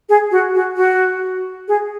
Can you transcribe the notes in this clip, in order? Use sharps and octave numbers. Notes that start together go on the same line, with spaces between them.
G#4
F#4
F#4
F#4
G#4